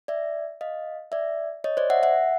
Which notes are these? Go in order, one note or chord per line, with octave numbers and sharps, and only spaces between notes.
D5 E5
D#5 F5
D5 E5
C#5 D#5
C5 D5
E5 F#5
E5 F#5